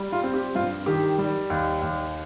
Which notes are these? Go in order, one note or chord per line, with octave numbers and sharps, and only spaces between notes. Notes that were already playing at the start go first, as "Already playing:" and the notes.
Already playing: G3
F4
C4
G4
G2 F4
D#3 G4
G3
D#2
D#2